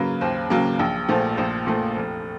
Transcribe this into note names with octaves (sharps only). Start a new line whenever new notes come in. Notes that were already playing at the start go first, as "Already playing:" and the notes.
Already playing: C#3 F#3 A#3 B4
D#2 C5
C#3 F#3 A#3
A#1
A#2 F3 A3
A#1 C5
A#2 F3 A3
F1